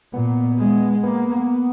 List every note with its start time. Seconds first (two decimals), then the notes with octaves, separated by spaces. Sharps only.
0.13 A#2 B3
0.58 G#3
1.03 A#3 B3